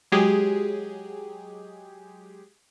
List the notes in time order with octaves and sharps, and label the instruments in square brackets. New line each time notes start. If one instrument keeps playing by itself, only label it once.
[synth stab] F#3 G#3 G4 G#4